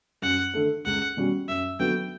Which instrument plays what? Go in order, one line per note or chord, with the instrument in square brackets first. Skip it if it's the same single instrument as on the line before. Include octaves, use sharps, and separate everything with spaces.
[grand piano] F#2 [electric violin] F#5
[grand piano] D3 A3
[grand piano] C#2 [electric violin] F#5
[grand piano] B2 G3 C#4 F#4
[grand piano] F#2 [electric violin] E5
[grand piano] D3 F#3 B3 F#4 [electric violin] G5